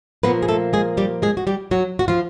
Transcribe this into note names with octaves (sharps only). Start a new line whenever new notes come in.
A#2 F3 A#3 B3 B4
G#4
A3 A4
G#3 G#4
G3 G4
G#3 G#4
F#4
G3 G4
F#3 F#4
F#4
F3 F4